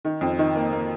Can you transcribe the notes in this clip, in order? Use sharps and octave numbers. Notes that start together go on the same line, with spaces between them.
D#3
F2
D#3
A#3
A#3